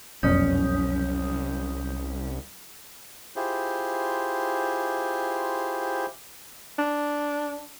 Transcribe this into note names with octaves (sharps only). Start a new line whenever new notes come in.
F#1 C2 F2 B2 F#3 C#4 D#6 G6
E4 F4 G4 G#4 C5
D4